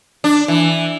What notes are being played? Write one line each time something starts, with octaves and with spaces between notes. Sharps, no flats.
D4
E3